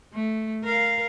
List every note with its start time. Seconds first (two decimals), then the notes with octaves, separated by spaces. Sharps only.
0.14 A3
0.64 A#4 F5